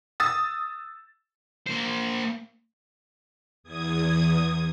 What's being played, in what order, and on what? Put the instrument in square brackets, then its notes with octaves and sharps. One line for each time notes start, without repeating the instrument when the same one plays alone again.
[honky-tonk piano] D#6 E6 A6
[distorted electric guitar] A#3 C5
[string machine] E2 D#6 G#6